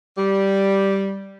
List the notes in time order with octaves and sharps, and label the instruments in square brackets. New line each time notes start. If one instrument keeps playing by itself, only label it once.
[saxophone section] G3